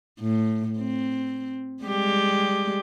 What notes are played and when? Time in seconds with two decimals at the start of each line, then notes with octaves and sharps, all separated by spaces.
0.20 A2
0.79 C4
1.83 G3 G#3 G4